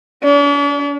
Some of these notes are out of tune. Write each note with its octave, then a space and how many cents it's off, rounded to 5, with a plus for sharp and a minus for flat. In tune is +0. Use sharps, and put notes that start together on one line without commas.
D4 -45